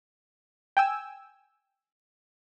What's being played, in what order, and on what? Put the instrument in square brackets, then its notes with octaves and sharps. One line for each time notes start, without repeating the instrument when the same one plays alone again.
[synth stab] G5 G#5 E6